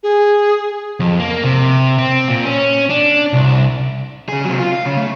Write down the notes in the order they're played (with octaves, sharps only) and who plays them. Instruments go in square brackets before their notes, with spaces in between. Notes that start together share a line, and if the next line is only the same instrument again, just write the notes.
[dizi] G#4
[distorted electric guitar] F2
A#3
C3
C4
A#2
C#4
D4
C2
[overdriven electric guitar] C#3 G#4
C3 F#3
F4
F5
C#3 C#4
A3